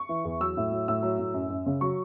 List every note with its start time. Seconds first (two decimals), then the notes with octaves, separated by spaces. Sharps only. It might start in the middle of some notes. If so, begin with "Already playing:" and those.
Already playing: C#6
0.09 E3
0.25 E2
0.40 F#3 E6
0.57 A2
0.71 F#3
0.88 A2 E6
1.03 F#3
1.19 A2
1.34 F#2
1.50 F#2
1.66 C#3
1.81 F#3 C#6